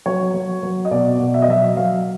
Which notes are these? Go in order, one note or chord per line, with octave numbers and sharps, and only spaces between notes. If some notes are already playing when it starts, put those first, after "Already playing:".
F#3 C#5
F#3
F#3
D#5
B2 D5
B2
E5
D#5
F#3 E5
F#3 F5